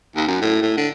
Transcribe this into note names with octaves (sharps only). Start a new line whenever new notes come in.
D#2
F#2
A2
A2
D3